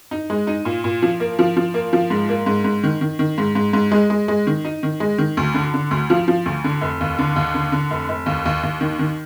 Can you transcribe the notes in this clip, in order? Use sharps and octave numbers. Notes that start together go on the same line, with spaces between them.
D#4
G#3
D#4
A#2
A#2
F3
A#3
F3
F3
A#3
F3
G#2
A#3
G#2
G#2
D#3
D#3
D#3
G#2
G#2
G#2
G#3
G#3
G#3
D#3
D#4
D#3
G#3
D#3
D2
D3
D3
D2
F3
F3
D2
D3
F1
D#2
D3
D#2
D3
D3
F1
F1
D#2
D#2
D#2
D#3
D#3